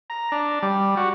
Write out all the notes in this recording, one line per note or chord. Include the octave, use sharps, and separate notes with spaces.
A#5
D4
G3
F#4